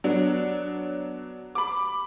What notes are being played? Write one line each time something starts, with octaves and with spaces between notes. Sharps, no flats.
F#3 B3 D4
B5 D6